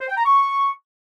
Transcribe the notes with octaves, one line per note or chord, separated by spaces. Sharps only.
C5
G5
A#5
C#6